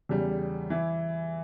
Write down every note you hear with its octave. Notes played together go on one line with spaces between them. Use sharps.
E2 C#3 G3
E3 E4